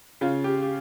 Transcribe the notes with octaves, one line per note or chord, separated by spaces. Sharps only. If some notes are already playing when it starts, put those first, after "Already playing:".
C#3 F4
G4
G4